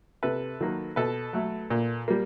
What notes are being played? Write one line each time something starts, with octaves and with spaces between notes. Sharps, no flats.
C3 A4 B4
D#3 F#3 A#3
B2 A4 B4
F#3 A3
A#2
G3 A#3